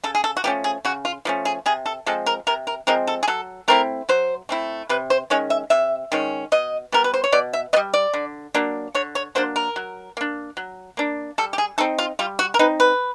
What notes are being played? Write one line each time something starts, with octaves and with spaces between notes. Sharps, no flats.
C#3 A4
G#4
A4
F#4
F3 A3 C#4 G4
G#4
C#3 F#4
F4
F3 A3 C#4
G#4
C3 G#4
A4
F3 G#3 C4 A4
A#4
C3 A#4
A#4
F3 G#3 C4 A#4
A4
G#4
F#3 A4
A3 C4 E4 A#4
F#3 C5
A3 C4 E4
C3 B4
C5
D#3 G#3 C#4 C#5
E5
C3 E5
D#3 G#3 C#4
B2 D#5
G3 B3 A#4
B4
C5
C#5
B2 D5
E5
B3 D#5
G3
D5
D3
F#3 A#3 D4
D3 C#5
C#5
F#3 A#3 D4 C5
A#4
F#3
A#3 D4
F#3
A#3 D4
G3 A4
G4
G#4
C4 D#4 A4
F4
G3 F4
F#4
A#4
C4 D#4 B4
B4